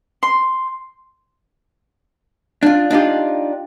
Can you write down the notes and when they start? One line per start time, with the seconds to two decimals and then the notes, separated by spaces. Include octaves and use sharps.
0.23 C6
2.63 D4 F4
2.91 D4 D#4 F4 G4